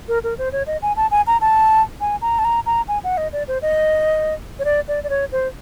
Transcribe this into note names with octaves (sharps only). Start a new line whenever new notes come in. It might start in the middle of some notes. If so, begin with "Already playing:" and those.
A#4
A#4
C5
C#5
D#5
G#5
A5
G#5
A#5
A5
G#5
A#5
A5
A#5
A#5
G#5
F#5
D#5
D5
C5
D#5
C#5
D5
D5
D5
C#5
C5